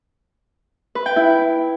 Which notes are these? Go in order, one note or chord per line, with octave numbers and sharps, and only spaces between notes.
B4
G5
E4